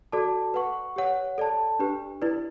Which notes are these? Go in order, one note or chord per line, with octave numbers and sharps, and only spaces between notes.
F#4 A4 D5 A5 D6
B4 F#5 C#6
G4 C#5 F#5
A4 D5 A5
D4 G4 B4
E4 B4 D5